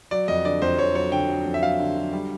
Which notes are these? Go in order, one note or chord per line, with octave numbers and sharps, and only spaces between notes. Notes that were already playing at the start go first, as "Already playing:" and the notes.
F#3 D5
F2 D#5
D3 D5
F2 C5
F2 C#5
F#3 C#5
D3 G5
F#3
F2
E5
F#3 F5
D3
F#3
G3